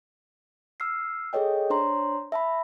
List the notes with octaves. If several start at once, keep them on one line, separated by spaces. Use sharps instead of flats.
E6 F6 C7
G#4 A4 C#5 D#5 G5
D4 C5 C#5 A#5 C6
E5 A5 B5